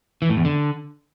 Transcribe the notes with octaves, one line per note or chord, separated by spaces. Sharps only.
E3
A2
E2
D3